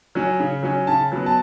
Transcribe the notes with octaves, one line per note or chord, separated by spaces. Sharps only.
F#3 C#4
C#3
F#3 C#4
C#3 A5
F#3 B3
A5